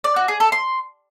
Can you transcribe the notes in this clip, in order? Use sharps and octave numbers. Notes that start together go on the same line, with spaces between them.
D5
F#4
G#4
A4
C6